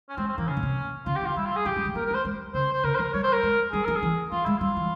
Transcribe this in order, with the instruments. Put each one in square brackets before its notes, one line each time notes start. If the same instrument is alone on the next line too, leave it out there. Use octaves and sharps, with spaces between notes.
[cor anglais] C#4
[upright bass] G#3 [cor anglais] C4
[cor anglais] C4
[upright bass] E3 [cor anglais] A#3
[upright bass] C#3 [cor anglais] C#4
[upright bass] A#2
C3
[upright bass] C#3 [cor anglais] F4
[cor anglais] G4
[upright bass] E3
[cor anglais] F4
[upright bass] G3 [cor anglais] E4
[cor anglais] F4
G#4
[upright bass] F3 [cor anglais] G4
[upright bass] G3
G#3
[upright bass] A#3 [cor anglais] A#4
[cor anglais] A#4
[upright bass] G#3
[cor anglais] C5
[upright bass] G#3
[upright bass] C#3 [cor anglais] C5
[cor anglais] C5
[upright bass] C#3 [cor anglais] A#4
[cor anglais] C5
[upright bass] F3 [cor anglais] A#4
[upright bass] G3 [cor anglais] C#5
[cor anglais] C5
A#4
[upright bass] G#3
[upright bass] G3 [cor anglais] G#4
[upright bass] F3 [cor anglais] A#4
[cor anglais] G#4
[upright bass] E3
[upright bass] F3 [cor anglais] F4
[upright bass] G#3 [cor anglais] E4
[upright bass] G3 [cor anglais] F4
[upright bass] E3